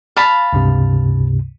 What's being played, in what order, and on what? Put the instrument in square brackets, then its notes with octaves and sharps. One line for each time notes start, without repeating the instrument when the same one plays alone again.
[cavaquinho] F5 A5 B5
[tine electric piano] C#2 G2 C3